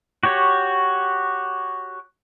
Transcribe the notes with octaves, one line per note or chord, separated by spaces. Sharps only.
F#4 G4 C#5